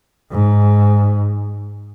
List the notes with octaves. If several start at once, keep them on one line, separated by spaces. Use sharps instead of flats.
G#2